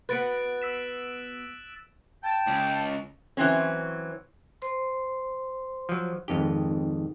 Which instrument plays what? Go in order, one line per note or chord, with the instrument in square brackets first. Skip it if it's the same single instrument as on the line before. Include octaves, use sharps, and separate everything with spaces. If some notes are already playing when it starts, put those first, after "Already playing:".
[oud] B3 F#4 B4 [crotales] F#6 A6 D7
[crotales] E6 B6 E7
[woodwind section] G5 A5
[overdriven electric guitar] C#2
[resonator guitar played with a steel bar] E3 F#3 C4 C#4
[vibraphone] C5 C6
[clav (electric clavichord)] F3 F#3
[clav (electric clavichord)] G#1 F2 G4 [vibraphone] D#4